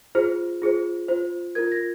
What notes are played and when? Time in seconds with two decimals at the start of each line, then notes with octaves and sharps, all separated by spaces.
0.15 F4 G#4 C5 F6
0.62 F4 G#4 C5
1.08 F4 C5
1.55 F4 A#4 G#6
1.72 A#6